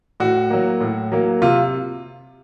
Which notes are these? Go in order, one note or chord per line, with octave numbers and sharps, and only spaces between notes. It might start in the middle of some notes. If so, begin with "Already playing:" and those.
A2 F#4
F#3 A#3
A2
F#3 A#3
C3 F4